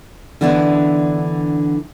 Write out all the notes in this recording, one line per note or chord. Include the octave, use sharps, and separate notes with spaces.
D3 E3 B3 D4 E4